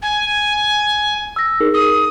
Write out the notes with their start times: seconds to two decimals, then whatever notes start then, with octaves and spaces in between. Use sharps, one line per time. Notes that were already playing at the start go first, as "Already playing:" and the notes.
0.02 G#5
1.36 E6 A#6
1.60 D#4 G#4 A#4
1.73 D#6